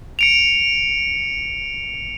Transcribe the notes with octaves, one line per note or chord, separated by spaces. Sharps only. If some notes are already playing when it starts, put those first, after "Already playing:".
C#7 D7 F7